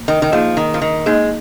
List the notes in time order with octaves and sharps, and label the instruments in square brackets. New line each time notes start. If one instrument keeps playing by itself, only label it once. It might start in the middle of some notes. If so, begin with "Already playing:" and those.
Already playing: [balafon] A#3
[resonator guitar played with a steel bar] D#3
D#3
[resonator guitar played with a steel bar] F3 [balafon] A#3 D#4 G#4
[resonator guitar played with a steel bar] D#3
F3
D#3
[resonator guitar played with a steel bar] G#3 [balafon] A#3 D#4 G#4